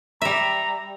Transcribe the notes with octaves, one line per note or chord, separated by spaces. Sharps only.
G3 E5 A#5